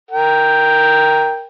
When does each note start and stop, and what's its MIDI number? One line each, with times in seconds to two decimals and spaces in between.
0.11 1.46 70
0.11 1.46 79